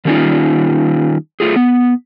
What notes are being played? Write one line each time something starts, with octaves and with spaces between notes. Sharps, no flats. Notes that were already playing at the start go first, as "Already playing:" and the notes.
D#3 G3 A#3 C#4 D#4 F4
A3 F4 G#4
B3